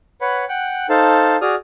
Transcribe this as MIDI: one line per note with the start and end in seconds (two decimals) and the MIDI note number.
0.21 0.45 71
0.21 0.45 73
0.21 0.45 78
0.21 0.45 83
0.49 0.86 78
0.49 0.86 79
0.49 0.86 90
0.89 1.37 63
0.89 1.37 69
0.89 1.37 72
0.89 1.37 77
0.89 1.37 81
1.41 1.55 66
1.41 1.55 68
1.41 1.55 74
1.41 1.55 87
1.41 1.55 89